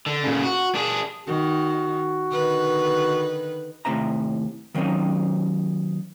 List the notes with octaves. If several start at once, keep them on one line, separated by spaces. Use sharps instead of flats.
D3
A#2 C#3
F#4
D4 G#4
D#3 F#4
D3 D#3 B4
D#2 A2 C3 E5 A#5
D#3 F#3 A#3 C4 C#4 D#4